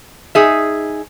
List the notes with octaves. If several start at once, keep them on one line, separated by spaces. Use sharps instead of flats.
D#4 G#4 E5